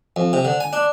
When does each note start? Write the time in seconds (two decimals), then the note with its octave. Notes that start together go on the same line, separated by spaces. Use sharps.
0.16 F2
0.33 C3
0.45 D3
0.60 G#5
0.73 D4